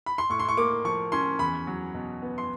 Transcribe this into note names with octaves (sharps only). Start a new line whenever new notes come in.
B5
C6
A2 C#6
C6
C#6
A#3 D6
F3 C#6
C#4 C6
E2 B5
F#3
B2
B3
C6